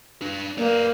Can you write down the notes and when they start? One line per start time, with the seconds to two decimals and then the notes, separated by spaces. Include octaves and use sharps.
0.22 D4 B4
0.58 A#3 B4 D5